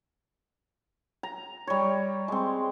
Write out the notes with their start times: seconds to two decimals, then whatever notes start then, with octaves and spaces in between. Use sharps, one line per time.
1.23 A#5
1.67 G3 C#5
2.28 G#3 C4